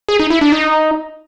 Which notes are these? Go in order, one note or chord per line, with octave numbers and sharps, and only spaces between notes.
G#4
D#4
E4
D4
D#4